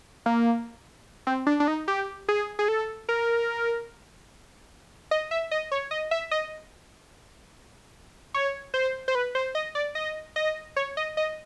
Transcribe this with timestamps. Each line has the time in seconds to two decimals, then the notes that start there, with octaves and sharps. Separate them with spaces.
0.26 A#3
1.27 C4
1.47 D4
1.60 D4
1.68 D#4
1.88 G4
2.28 G#4
2.59 G#4
2.68 A4
3.09 A#4
5.11 D#5
5.31 E5
5.51 D#5
5.71 C#5
5.91 D#5
6.11 E5
6.31 D#5
8.34 C#5
8.74 C5
9.08 C5
9.15 B4
9.35 C5
9.55 D#5
9.75 D5
9.95 D#5
10.36 D#5
10.76 C#5
10.97 D#5
11.17 D#5